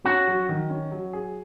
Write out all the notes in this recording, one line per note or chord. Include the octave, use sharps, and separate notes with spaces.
C#4 F#4 F#5
F#3
D#3
C#4
F#3
G#4